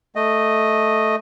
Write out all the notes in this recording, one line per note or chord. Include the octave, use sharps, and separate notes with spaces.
A3 D#5